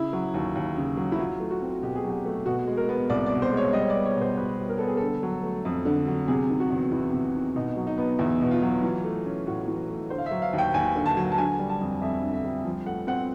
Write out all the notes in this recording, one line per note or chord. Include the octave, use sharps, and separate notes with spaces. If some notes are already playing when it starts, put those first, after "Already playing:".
Already playing: C#3 E4
F#3
D#2
D#2
C#3
F#3
E4
F#3 F4
A3
F#4
C4
B2 G4
G#4
F#3
G4
A3
B2 F#4
G#3
A#4
B3
C2 D5
D5
B2
C5
G#3 C#5
G3 D#5
C#5
D5
B3
C#5
B2
C5
B2 B4
G3
A#4
B3 A4
G#4
D3 A4
F#3
A3
F2
D3
F#3
C3 G#4
D#3
F#4
E2
E2 E4
C3
D#3
B2 D#4
F#3
D#4
B3
E2 E4
B2
F4
F#3
E3
A3
C#4
A2 F#4
E3
A3
D3 C5
F5
E5
F#3
F5
D#2
G5
D#2 G#5
D3
A5
F#3
A5
D3 G#5
G3
A5
F2
F2 E5
D3
E5
G3
F3
A3 F#5
C4 F#5